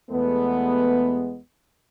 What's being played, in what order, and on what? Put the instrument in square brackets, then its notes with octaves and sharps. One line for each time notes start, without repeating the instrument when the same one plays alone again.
[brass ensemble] E2 G#3 A3 B3